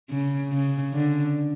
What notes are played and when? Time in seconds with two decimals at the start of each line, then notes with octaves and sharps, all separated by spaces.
0.11 C#3
0.52 C#3
0.94 D3